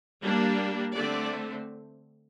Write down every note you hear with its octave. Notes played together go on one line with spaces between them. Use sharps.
G3 A#3 D4
D3 A3 C4 D5